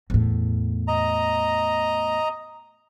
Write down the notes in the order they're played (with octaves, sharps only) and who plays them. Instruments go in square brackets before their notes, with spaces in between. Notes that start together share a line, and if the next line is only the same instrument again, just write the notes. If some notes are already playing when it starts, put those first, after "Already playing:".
[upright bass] E2 A2
[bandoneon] D#5 A#5